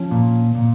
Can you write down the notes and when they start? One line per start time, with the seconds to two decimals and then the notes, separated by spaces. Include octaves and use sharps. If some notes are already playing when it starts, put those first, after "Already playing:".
Already playing: F3 C#4
0.11 A#2
0.55 A#2